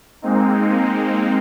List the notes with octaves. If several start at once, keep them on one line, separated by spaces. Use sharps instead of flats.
G#3 A#3 C4 D#4